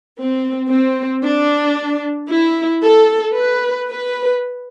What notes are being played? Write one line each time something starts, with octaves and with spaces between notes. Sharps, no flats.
C4
C4
D4
E4
A4
B4
B4